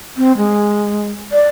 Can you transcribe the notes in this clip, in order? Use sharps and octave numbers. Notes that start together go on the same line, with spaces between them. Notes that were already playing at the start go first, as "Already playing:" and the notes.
C4
G#3
D5